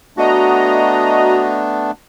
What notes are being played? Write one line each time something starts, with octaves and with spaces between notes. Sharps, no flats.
A3 B3 D4 F#4 D#5 A#5